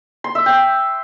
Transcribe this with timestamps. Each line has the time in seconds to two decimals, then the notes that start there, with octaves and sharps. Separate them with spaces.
0.24 C6
0.35 E5
0.46 G5